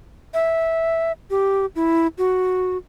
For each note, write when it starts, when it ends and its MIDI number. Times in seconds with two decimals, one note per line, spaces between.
0.34 1.12 76
1.30 1.66 67
1.76 2.07 64
2.18 2.77 66